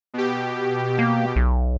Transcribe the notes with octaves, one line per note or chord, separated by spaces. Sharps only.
B2 G4
A#3
B1